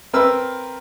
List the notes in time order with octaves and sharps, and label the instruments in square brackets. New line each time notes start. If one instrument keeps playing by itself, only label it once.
[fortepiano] C4 A#4 B4 E6